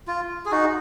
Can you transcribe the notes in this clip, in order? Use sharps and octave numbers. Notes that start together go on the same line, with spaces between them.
F4
G#4
D#4 F#4